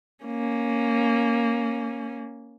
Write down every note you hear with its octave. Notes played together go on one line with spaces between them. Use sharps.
A#3 C#4